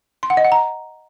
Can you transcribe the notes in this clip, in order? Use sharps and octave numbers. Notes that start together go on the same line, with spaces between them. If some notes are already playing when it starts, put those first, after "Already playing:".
C6
F#5
D#5
F#5
A#5